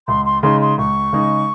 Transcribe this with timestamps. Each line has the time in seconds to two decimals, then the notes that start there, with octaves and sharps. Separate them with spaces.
0.07 C#2 C6
0.25 C6
0.42 C#3 G#3 D#4 C6
0.61 C6
0.78 C#2 C#6
1.13 C#3 G#3 D#4